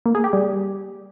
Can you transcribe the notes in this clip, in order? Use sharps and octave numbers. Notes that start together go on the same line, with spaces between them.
A#3
G#4
G4
G3